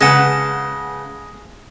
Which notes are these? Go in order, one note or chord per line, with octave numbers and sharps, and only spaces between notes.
C#3 G#3 B4 F#5 A5